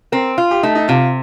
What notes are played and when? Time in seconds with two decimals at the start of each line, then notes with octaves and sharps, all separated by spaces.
0.12 C4 A#4
0.38 F4
0.51 G4
0.63 A3 D#4
0.75 D#4
0.88 C3 F4